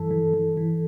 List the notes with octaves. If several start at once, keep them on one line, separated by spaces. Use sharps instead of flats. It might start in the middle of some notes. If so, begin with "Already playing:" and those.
Already playing: G2 E3 A4
E3
E3
E3